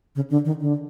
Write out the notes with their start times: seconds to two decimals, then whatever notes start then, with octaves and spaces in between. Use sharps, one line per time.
0.16 C#3
0.30 D3
0.45 D#3
0.60 D3